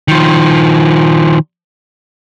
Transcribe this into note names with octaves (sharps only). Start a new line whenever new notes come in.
D#3 F3